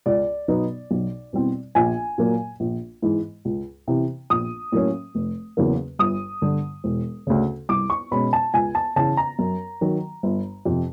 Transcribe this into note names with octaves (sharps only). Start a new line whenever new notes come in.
C#2 D5
B2 F#3 B3 D#4
B1
B2 G3 C4 E4
A#1 G#5
A#2 F#3 A#3
A#1
G#2 E3 G#3
C#2
C3 E3
A#1 D#6
A2 F#3 A#3 C#4
F1
E2 C#3 F#3 A#3
G1 D#6
G2 D3 G3
E1
D2 C#3
C2 D6
C#6
B2 G#3 C#4 B5
A5
C#2 G#5
A5
C#3 E3 A5
A#5
F#2
D#3 F#3
G1
F2 C3